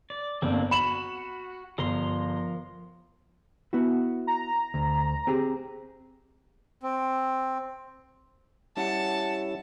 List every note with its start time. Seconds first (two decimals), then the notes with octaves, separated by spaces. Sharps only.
0.10 D5
0.42 G1 A#3 C4 D4
0.71 F#4 B5 E7 F#7
1.78 G1 F3 A#4 C6
3.73 B3 E4 F#4
4.27 A#5
4.74 D2
5.27 C4 G4 G#4
6.83 C4
8.77 G3 C#4 E4 F#5 A5